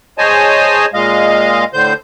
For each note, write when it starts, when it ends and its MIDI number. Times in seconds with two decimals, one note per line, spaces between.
0.18 0.86 68
0.18 0.86 72
0.18 0.86 73
0.18 0.86 75
0.18 0.86 80
0.18 0.86 81
0.94 1.64 46
0.94 1.64 56
0.94 1.64 75
0.94 1.64 77
1.74 1.93 45
1.74 1.93 50
1.74 1.93 72
1.74 1.93 91